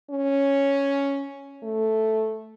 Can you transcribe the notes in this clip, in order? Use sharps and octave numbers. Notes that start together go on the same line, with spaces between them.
C#4
A3